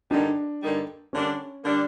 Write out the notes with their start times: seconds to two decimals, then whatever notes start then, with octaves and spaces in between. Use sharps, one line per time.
0.11 G2 D3 G3 A#3 D4 D#4
0.61 G2 D3 G3 A#3 D#4
1.13 D3 G3 A#3 C#4 D4
1.64 D3 G3 A#3 D4